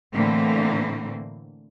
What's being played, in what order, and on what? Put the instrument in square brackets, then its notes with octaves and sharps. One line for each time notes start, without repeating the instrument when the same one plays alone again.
[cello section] A2 D3 E3 A#3 C4